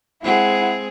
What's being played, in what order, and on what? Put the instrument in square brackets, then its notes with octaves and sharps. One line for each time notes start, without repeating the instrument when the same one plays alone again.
[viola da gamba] G#3 C4 G#4 [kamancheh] E4 F#5